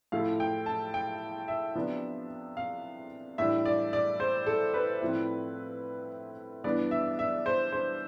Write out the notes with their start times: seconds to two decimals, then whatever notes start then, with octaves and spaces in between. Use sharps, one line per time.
0.12 A2 F3 A3 E4 F5
0.40 G5
0.66 A5
0.94 G5
1.48 E5
1.75 C3 F3 B3 D4
2.57 F5
3.38 A2 E3 G3 D4 E5
3.65 D5
3.93 D5
4.20 C5
4.47 A4
4.74 B4
5.01 A2 F3 C4 E4
6.64 G2 E3 B3 D4 D5
6.91 E5
7.19 E5
7.46 C5
7.72 C5